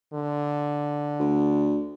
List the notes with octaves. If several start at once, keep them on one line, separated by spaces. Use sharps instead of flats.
D3
D2